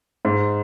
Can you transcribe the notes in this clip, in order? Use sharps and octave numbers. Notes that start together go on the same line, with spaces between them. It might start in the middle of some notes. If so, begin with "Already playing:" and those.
G#2